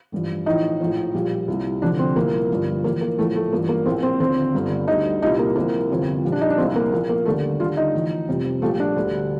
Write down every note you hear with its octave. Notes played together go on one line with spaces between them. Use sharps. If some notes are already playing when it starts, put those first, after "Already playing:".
A1 G2 F3
A1 A2 F3 D#4
A#1 A2 F3
A#1 A#2 G3
C2 A#2 G3
F1 F2 D3 D4
C4
C2 A#2 F3 A#3
G1 G2 F3
A1 A2 F3 A#3
A#3
A#1 A2 F3 A3
A3
A1 G2 F3 A#3
A#3
A#1 A2 F3 C4
C4
D#2 D3 F3 C4
G1 G2 D3
D2 D3 G3 D#4
C2 A#2 G3 D#4
A#3
C2 C3 F3 A#3
G1 F2 C3 F3
A#1 A#2 G3
D4
D#4
D4
C2 A#2 F3 C4
A#3
A#1 A#2 F3 A#3
A#3
D#2 D3 G3 A3
D#2 D3 G3 F4
D#4
A1 A2 F3
F1 F2 C3 G3
A#1 A#2 G3 A3
D4
D2 D3 G3